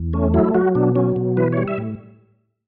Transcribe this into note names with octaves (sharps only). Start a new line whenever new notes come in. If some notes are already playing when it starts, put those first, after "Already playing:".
Already playing: E2
A3 C#4
F#3 E4
F#3 F#4
B2 D4
F#3 C#4
B2
E3 B4
G3 C#5
E5
A2